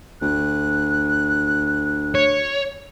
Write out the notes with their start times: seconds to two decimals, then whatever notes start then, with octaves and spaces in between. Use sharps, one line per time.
0.21 D2 F#6
2.15 C#5